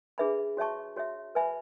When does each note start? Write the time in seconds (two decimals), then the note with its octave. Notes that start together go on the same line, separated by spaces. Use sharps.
0.18 D4 G#4 B4 E5 B5
0.57 F#4 C#5 E5 A5 C#6
0.96 F#4 C#5 E5
1.35 B4 E5 G#5 B5